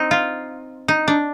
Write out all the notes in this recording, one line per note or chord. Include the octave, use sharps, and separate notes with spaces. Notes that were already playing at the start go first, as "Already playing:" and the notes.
Already playing: C4 D#4
F4
D#4
D4